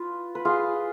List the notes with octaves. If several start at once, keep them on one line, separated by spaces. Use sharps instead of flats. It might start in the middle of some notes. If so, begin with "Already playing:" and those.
Already playing: F4 B4
B4
F4 G#4